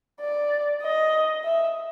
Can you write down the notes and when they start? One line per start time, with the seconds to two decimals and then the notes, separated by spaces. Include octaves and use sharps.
0.20 D5
0.83 D#5
1.45 E5